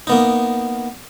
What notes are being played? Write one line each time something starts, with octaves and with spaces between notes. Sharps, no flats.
A#3 B3 D#4